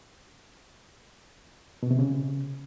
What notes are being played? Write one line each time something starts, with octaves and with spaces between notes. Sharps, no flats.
B2
C3
C#3